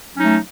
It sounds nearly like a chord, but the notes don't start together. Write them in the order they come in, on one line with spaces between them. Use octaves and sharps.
F#3 C#4 D#4 A3